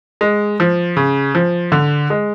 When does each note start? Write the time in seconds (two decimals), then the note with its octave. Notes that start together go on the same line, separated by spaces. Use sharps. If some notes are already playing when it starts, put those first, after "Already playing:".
0.21 G#3
0.60 F3
0.97 C#3
1.35 F3
1.72 D3
2.10 G#3